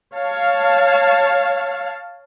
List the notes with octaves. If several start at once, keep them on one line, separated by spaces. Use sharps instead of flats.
C#5 F5 A5